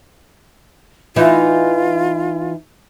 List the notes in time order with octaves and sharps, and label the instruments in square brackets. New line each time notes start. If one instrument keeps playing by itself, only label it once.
[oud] E3 D#4 E5 [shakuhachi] F4